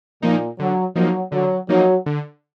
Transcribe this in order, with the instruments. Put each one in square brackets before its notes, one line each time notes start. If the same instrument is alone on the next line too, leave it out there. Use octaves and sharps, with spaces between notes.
[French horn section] A#2 [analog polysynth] F3 A#3 D#4
[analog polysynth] D3 [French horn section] F#3
[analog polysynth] F3 A#3 D#4 [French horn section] F#3
[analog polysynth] D3 [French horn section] F#3
[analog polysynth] F3 A#3 D#4 [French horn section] F#3
[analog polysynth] D3